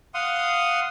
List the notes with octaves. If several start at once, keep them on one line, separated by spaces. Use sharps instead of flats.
F5 F#5 C6 D#6